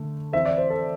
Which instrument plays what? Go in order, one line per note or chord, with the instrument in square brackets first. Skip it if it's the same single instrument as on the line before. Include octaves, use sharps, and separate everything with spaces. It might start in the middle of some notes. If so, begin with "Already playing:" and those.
Already playing: [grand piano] D3 A3
E3 C4 E5
D5
C5
A4